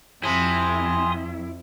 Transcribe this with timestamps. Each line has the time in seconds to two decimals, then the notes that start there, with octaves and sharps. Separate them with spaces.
0.23 F2 C3 F3 E4 G#5 C6 D#6